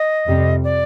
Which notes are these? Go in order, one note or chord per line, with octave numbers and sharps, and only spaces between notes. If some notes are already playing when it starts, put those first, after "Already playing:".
Already playing: D#5
F2 C3 G3
D5